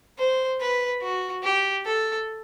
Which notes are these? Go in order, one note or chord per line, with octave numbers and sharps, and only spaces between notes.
C5
B4
F#4
G4
A4